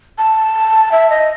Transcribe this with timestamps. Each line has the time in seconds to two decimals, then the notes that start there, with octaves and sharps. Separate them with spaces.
0.18 A5
0.92 E5
1.10 D#5